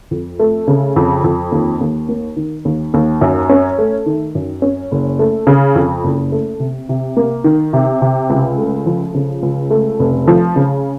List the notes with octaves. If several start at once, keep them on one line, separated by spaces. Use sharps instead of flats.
F2
A3
C#3
F2
F2
D#2
D#2
A#3
D#3
D#2
D#2
F#2
C#4
A3
D#3
F#2
C#4
F#1
A3
C#3
F2
F#1
A3
C3
C3
A#3
D#3
C3
C3
C#2
A3
F3
C#3
C#2
A3
F1
F3
C#3